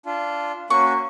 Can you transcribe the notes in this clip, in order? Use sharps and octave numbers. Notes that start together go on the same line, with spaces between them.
D4 F4
A#3 C#4 F#4 C#6